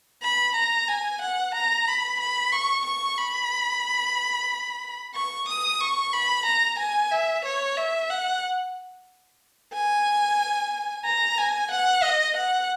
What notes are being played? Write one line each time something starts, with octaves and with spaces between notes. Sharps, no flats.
B5
A#5
G#5
F#5
A#5
B5
B5
C#6
C#6
B5
C#6
D#6
C#6
B5
A#5
G#5
E5
C#5
E5
F#5
G#5
A#5
G#5
F#5
D#5
F#5